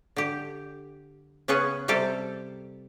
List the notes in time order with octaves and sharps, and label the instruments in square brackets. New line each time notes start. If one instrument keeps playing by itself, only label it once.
[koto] D3 G4
C#3 B3 C#4 G#4 F#5
C3 G3 G4 A4 C5